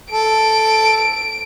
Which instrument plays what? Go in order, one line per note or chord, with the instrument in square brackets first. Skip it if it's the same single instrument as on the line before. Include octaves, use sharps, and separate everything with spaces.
[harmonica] A4 [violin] D7